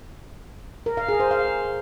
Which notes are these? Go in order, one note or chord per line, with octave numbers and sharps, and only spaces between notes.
A#4
F5
G#4
C5
F5